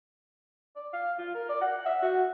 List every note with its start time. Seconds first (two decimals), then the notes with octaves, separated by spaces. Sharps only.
0.76 D5
0.93 F5
1.18 F4
1.35 A#4
1.49 D5
1.61 F#5
1.86 E5
2.02 F#4